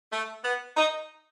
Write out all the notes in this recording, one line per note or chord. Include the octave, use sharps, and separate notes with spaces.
A3
B3
D#4